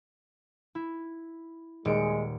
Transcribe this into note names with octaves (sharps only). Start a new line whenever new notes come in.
E4
D#1 G#3 C#7 D7